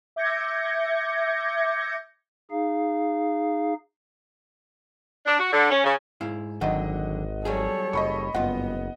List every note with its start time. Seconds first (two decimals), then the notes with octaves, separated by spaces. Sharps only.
0.16 E5 D6 G6 G#6 A#6 C#7
2.51 D#4 G#4 F5
5.26 D4
5.40 F#4
5.53 D3
5.71 C#4
5.84 C#3
6.21 G#2 E4 F5
6.61 G#1 D3 D#3 F#3 D#5 F#5
7.45 F#3 G3 G#4 A4 C#5
7.93 F#1 D#5 B5 C#6
8.34 F#1 G2 B3 F4 D#5 F#5